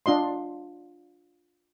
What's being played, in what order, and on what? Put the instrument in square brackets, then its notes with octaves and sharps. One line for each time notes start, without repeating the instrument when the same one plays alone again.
[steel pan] D4 F4 D#5 C6